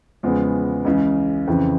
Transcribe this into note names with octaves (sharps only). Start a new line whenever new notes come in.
E2 C#3 F3 G#3 B3
C#2 C#3 E3
F2 C#3 E3